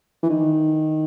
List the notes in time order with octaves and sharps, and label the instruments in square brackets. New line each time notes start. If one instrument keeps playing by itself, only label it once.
[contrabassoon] E3
D#3